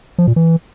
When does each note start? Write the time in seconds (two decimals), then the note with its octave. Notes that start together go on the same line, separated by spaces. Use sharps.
0.18 F3
0.27 A#2
0.36 E3